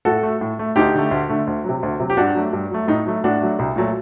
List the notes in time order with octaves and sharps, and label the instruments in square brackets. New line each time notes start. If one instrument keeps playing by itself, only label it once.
[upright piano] A2 F#4 A4
A3
A2
A3
D2 D#4 G4
D3 A3
D2
D3 A3
D2
C3 F#3
D2
C3 F#3
G4
G2 D4 F#4
F#3 A3
G2
F#3 A3
A2 D#4
F#3 A3
A2 D4 F#4
F#3 A3
C2
A#2 F#3 A3